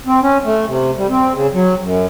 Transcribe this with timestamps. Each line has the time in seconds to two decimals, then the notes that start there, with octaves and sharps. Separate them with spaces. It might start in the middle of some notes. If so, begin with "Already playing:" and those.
0.06 C4
0.22 C#4
0.45 A3
0.67 C3
0.97 G3
1.09 C4
1.33 C#3
1.53 F#3
1.83 F#2